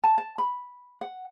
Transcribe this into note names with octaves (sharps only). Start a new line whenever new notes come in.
A5
A5
B5
F#5